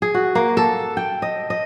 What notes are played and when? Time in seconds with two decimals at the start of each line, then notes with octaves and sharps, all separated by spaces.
0.02 G#4
0.14 F#4
0.35 A#3
0.57 A4
0.97 G5
1.22 D#5
1.50 D#5